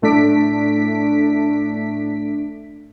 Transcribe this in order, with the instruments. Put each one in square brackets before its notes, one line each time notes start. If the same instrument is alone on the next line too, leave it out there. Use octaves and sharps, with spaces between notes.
[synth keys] A2 A3 D4 B6 D7